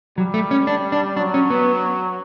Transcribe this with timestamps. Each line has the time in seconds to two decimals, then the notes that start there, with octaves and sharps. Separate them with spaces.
0.18 F#3 G3
0.34 A3
0.51 C#4
0.67 D4
0.92 D4
1.17 F#3 D4
1.34 C#4
1.50 B3